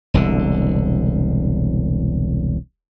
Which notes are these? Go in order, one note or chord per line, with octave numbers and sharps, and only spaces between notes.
E1 C2 D3